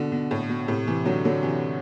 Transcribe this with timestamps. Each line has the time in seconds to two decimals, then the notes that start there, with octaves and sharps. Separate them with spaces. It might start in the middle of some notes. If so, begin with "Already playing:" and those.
Already playing: B2 D3
0.12 B2
0.31 A2
0.49 B2
0.68 A2 C3
0.87 C3 E3
1.05 D3 F#3
1.25 D3 F#3
1.43 C3 E3